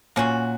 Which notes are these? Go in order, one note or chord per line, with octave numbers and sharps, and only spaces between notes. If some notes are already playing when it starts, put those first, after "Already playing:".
A#2 A#3 C#4 F#4